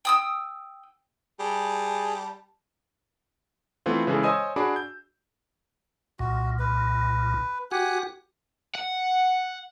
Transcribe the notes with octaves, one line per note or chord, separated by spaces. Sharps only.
G5 D#6 E6
G3 G#4 A5
E3 A3 B3 C4 F4
C#3 E3 G#3 G#4 A4
C5 C#5 D#5 G#5 D#6 E6
D4 F#4 G#4 B5 C#6 D6
G6
C2 A#2 F#4
B4
F#4 G4 F#5 G#5
F#5